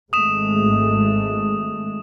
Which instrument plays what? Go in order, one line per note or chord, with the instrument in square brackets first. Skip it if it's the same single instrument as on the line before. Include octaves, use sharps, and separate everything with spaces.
[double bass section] G#1 G#3 A3 [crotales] D#6 E7